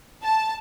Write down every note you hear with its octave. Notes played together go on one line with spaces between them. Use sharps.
A5